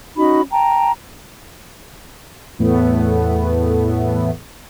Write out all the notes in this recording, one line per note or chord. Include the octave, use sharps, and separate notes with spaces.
C#4 D#4 F#4 B5
G5 A5 A#5
E2 A2 A3 B3